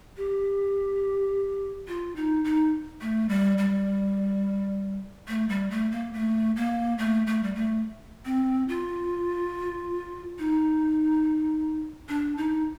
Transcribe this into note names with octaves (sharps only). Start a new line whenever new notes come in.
G4
F4
D#4
D#4
A3
G3
G3
A3
G3
A3
A#3
A3
A#3
A3
A3
G3
A3
C4
F4
D#4
D4
D#4